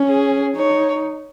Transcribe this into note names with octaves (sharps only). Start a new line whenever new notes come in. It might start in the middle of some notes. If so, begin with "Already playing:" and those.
Already playing: C#4
G#4
D#4 C#5